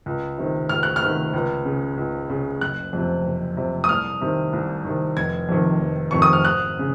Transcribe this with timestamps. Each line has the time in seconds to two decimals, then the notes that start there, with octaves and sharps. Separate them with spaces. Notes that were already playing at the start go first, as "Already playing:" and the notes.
0.06 C#2
0.38 C3 D#3
0.69 C#2 F6
0.83 F#6
0.96 F6
1.02 C3 D#3
1.33 C#2
1.65 C#3
1.97 C#2
2.29 C#3
2.61 F#1 F#6
2.93 F2 C3
3.25 F#1
3.57 F2 C3
3.84 D#6
3.89 C2 F6
4.21 C3 D#3
4.53 C2
4.85 C3 D#3
5.16 F1 G#6
5.49 F2 C3 D#3
5.81 F1
6.11 F2 C3 D#3 C#6
6.22 D#6
6.33 F6
6.44 G#1 F#6
6.79 C#3